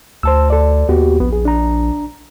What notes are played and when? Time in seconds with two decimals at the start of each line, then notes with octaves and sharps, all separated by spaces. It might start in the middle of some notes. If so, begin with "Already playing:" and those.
0.23 D2 C5 A5 E6
0.50 A4 D5
0.89 D#2 B3 F#4 G4
1.20 A#1 B3
1.33 G#4
1.45 D4 A#5